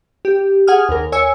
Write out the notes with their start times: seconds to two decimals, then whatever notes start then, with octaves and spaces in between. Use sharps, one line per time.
0.25 G4
0.67 G#4 F#5 G#5 D#6 F6
0.89 D#2 A#4
1.12 C#5 G#5 E6 C#7